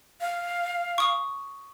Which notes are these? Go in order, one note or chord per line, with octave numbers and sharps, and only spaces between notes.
F5
C#6 D#6